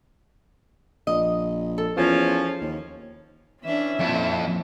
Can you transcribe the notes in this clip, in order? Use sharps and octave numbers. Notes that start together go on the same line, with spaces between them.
A#1 D#5
A4
E2 F3 C#4
D#2
E3 C#4 D4 E5
F2 A#2 E4